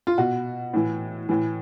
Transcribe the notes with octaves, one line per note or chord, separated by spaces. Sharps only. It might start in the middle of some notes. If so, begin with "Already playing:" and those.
F4
B2 F#4
A2 E3
A2 E3